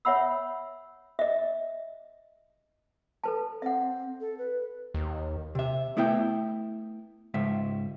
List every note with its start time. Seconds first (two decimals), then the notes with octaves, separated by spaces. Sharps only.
0.05 C#5 E5 F#5 B5 E6
1.19 D#5 E5
3.24 A4 B4 A5
3.62 C4 E5 F#5
4.21 A4
4.38 B4
4.94 D#2
5.55 C3 E5
5.97 A3 B3 E4 E5 G5
7.34 C#2 G#2 E5